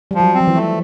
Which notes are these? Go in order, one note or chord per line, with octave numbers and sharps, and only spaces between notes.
F3 G3
F#3
C4
F3
E3
A3